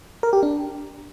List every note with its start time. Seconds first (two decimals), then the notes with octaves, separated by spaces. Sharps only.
0.23 A#4
0.33 G4
0.43 D4